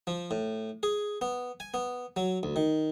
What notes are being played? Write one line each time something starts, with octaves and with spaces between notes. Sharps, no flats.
F3
A2
G#4
B3
G#5
B3
F#3
D2
D#3